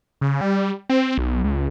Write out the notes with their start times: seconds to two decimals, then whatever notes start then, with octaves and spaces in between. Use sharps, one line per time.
0.21 C#3
0.41 G3
0.89 C4
1.18 B1
1.44 C#2